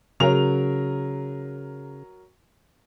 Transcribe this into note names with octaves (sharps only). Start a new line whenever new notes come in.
C#3 F#3 A#4 F7